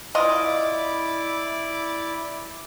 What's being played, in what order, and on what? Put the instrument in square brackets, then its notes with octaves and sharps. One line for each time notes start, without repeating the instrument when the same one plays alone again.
[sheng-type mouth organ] E4 D5 D6 [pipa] F4 D#5